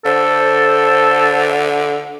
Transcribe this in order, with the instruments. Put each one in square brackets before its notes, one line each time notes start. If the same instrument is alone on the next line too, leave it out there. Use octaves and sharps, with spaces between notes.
[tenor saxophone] D3 [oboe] A4 [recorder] C5